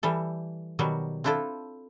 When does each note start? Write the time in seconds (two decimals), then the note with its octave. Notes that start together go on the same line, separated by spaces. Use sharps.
0.03 E3 G3 A4
0.79 B2 D#3 F#3 G3 F#4
1.24 C4 D4 E4 F4 A4